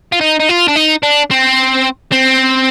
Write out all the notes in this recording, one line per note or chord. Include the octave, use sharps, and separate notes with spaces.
F4
D#4
D#4
F4
D4
D#4
D4
C4
C4